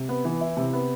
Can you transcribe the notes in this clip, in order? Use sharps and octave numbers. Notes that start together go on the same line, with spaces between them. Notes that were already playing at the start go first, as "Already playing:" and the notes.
Already playing: C3
B3
E3
E4
C3
B3